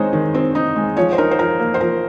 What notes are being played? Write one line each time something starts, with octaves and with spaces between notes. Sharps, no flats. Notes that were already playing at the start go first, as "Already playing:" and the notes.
Already playing: D#3 G#3 C4 D#4 C5 C#5
D#3
C4
D#4
G#3
F3 C#5
C5
D#4 A#4
C5
F3 A#4
A#3
C5
F3 A#4